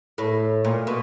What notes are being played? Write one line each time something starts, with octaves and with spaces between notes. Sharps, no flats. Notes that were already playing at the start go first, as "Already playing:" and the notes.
A2
A#2
B2